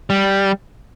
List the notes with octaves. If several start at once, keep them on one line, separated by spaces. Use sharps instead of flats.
G3